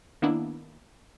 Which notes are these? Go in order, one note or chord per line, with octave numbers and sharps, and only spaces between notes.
D#3 A#3 B3 D4 E4